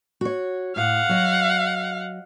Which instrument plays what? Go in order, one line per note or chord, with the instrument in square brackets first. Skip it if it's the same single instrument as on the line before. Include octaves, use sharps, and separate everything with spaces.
[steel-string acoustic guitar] F#4 C#5
[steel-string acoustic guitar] A2 [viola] F5 F#5
[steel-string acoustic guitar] F#3 D#5